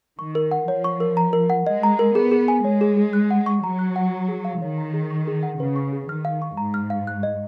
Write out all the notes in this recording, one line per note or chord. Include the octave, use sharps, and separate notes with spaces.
D#3 C#6
A#4
F#5
F3 C#5
C#6
A#4
A#5
A#4
F#5
G#3 D#5
A#5
A#4
B3 G#4
G#4
G#5
G#3 C#5
G#4
G#4
F#6
F#5
C#6
F#3 A#5
F#6
F#5
A#5
G#4
F5
D#3 C#5
A#5
G#4
C#6
G#4
F#5
C#3 B4
C#6
G#4
D#3 F6
F5
C#6
G#2 A#5
F6
F5
F#6
D#5